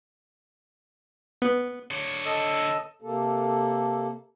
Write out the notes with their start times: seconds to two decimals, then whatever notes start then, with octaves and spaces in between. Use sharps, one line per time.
1.42 B3
1.91 D3 C#5
2.26 A4 D#5 E6
3.01 C3 A#3 A4